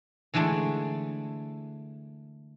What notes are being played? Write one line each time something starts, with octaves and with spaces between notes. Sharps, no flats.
D3 E3 G#3 A3 D4